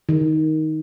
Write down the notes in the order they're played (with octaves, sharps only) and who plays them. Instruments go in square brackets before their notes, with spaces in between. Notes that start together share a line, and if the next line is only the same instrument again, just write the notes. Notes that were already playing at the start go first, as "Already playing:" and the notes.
[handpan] D#3